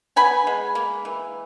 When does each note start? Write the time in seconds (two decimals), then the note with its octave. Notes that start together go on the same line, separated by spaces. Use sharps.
0.16 B3 G#5 B5
0.47 G#3
0.75 A#3
1.05 E3